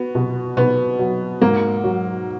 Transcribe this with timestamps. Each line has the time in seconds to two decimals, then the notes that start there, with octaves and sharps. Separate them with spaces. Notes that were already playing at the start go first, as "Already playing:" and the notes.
Already playing: B3 F#4
0.15 B2
0.57 B2 B3
0.99 F#3
1.42 G#2 A#3
1.84 F#3